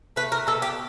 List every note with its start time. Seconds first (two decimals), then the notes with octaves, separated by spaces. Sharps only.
0.16 A3 B4
0.32 A#4
0.47 B2 A4
0.62 G4